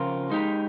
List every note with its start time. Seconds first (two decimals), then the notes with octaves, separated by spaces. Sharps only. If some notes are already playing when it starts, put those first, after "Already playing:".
Already playing: C#3 F3 C4 F4 A#4
0.30 G#3 D#4 G4